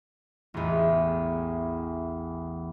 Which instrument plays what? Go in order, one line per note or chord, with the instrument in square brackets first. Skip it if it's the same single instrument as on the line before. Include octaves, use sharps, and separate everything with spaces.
[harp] A1 E2